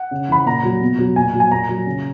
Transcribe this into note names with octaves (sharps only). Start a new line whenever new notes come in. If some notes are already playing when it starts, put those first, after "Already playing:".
Already playing: F#5
C#3
E3 B5
A#2 A#5
F#3
B2
F#3
A#2 G#5
F#3
G#5
A#2 A#5
F#3
C#3